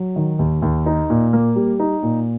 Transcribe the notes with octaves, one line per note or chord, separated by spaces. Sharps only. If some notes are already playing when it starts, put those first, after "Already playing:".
Already playing: F#3
D#3
D#2
D#2
D#4
A#2
A#3
G3
D#4
A#2